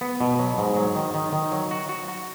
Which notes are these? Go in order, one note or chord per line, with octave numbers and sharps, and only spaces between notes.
B3
B2
F#3
G#2
F#3
D#3
D#3
D#3
F#3
F#4
F#4
F#4